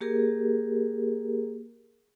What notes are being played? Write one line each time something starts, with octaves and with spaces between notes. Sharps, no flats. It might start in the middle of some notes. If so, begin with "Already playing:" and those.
A#3 G4 G#4 A#4